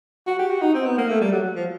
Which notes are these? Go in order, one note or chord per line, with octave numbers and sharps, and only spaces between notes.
F#4
G4
F#4
D#4
C4
B3
A#3
A3
G3
F#3
F3